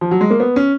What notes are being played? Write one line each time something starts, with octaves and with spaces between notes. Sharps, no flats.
F3
F#3
G#3
A#3
B3
C#4